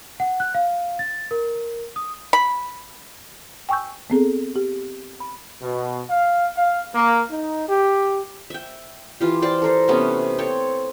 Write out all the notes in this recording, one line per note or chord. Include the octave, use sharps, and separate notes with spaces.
F#5
F#6
F5
A6
A#4
D#6
B5
G5 G#5 C#6 E6 G6
B3 C4 G#4 A4
G4
B5
B2
F5
F5
A#3
D#4
G4
E5 G5
E3 F4 G4
C5 D5 G5 A5
A4 A#4 C5
C3 A3 B3 C#4
C4 A4 C#5 G5